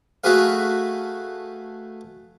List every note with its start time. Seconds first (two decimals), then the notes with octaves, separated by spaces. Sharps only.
0.24 A3 F#4 G#4 B4 F5